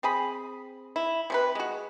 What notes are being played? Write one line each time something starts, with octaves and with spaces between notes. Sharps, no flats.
C4 G#4 B5
E4
C3 C#4 B4
G#3 F#4